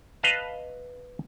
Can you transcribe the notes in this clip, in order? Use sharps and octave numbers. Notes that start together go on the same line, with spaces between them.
B4 D#5 F5 A5